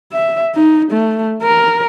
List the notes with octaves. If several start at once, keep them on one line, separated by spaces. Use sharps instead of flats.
E5
D#4
A3
A#4